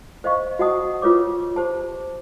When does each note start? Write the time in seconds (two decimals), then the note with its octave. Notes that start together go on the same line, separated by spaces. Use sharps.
0.24 C5 D#5 F5 C#6
0.59 F#4 C5 D#5 F#5 A5 D#6
1.02 F4 B4 C#5 D6
1.56 G4 C5 A5